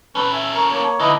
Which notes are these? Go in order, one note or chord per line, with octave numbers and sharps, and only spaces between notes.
C#4 A4 B4
E5 G#5
A#4 C#6
A#3 C#5
D#2 D3 E4 B4 D#5